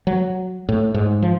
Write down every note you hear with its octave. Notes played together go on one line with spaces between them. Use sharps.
F#3
A2
G#2
F3